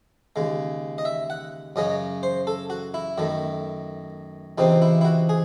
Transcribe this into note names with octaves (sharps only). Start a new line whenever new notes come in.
D#2 C#3 G#3
D#5
E5
F#5
F#2 C#3 F#3 C#4 D#5
C5
A4
F#4
E4
F#2 D#3 A3
C#2 C3 E3 C4 D#4
E4
E4
F#4
G#4